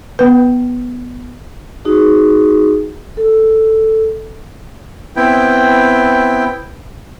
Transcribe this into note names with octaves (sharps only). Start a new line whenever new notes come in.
B3 B4
D#4 F#4 G#4
A4
B3 C4 E4 G5